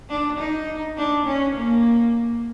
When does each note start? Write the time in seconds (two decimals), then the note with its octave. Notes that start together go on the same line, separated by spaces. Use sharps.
0.10 D4
0.38 D#4
0.97 D4
1.26 C#4
1.56 A#3